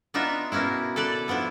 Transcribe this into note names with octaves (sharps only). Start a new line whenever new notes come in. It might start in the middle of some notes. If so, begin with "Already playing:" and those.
B3 D4 D#4 F4 E5
B2 A#3 B3 C#4 E4
A4 B4 D5
F3 B3 D4 E4